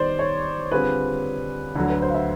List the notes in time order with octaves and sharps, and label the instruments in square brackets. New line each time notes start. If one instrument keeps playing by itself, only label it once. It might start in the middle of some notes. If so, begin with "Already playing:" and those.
Already playing: [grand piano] D#3 G3 B3 D#4 [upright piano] C5 D5
[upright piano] C#5
[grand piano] D3 G3 C4 F4 G#4 [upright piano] B4
[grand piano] D2 D3 F#3 [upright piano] A4
[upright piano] B4
C5
F5
E5